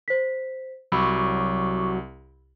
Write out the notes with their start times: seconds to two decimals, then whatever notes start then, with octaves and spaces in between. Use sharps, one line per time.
0.08 C5 B6
0.92 C2 F#3 B5 C#6 D6 E6